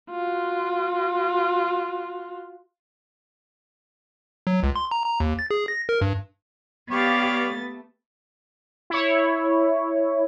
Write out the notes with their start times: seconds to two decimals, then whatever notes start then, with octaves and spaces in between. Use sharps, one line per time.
0.11 F4 F#4
4.47 F#3
4.63 C#2
4.76 C6
4.91 A#5
5.05 A#5
5.20 D#2
5.39 A6
5.51 G#4
5.68 A#6
5.89 A#4
6.01 G2
6.91 B3 G4 C#5 D5 F5 A6
7.45 A3
8.90 E4 C#5